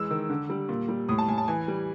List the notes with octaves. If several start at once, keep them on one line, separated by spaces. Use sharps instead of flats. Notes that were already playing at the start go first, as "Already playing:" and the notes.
Already playing: E3 G#3 E6
D#3
D3
G3
A#2
G3
A2 D#6
A5
A2 G#5
A5
E3 G#5
G3